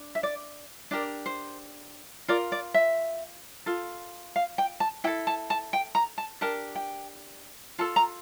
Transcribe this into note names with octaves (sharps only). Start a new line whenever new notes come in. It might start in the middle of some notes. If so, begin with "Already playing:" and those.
Already playing: D4
E5
D5
D4 G4 A#4 D5
C5
F4 A#4 D5
D5
E5
F4 A4
F5
G5
A5
E4 A4 G5
A5
A5
G5
A#5
A5
D4 G4 A#4 A5
G5
F4 A4 A5
A#5